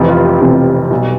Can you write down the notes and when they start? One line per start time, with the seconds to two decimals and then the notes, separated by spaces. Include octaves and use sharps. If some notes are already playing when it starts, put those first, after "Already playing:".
Already playing: F1 F2 C3 E3
0.09 F4
0.25 G4
0.41 F1 F2 C3 E3
0.91 B1 B2 G3